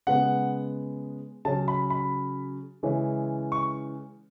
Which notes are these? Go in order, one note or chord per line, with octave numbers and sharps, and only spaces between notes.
C#3 G#3 B3 F#5
C#3 F#3 C#4 A5
B5
B5
C#3 E3 G#3 C#4
C#6